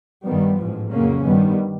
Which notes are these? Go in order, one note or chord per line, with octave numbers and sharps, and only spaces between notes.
G2 D#3 G3 B3
A1 G#2 F3
F2 C#3 F#3 A#3 C#4
G2 D#3 G3 B3